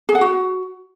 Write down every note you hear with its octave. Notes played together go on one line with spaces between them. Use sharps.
G#4
F#5
F#4